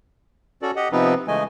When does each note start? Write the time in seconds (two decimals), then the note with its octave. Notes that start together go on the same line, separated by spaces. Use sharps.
0.62 C#4 F#4 A4 D5
0.76 G4 D#5 F#5
0.92 C3 F3 B3 C4 D#4 B4
1.28 C#3 E3 G#3 A3 D#5 G#5